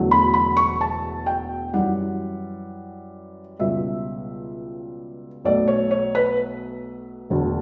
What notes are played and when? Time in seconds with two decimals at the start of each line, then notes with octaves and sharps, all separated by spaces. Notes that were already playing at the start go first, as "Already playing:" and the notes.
Already playing: E1 E2 D3 F#3 A3
0.11 B5
0.34 B5
0.57 C#6
0.81 A5
1.26 G5
1.74 F#2 E3 G3 F#5
3.60 C#2 B2 G3 E5
5.44 B1 B2 A3 D5
5.68 C#5
5.91 C#5
6.15 B4
7.30 E1 D2 D3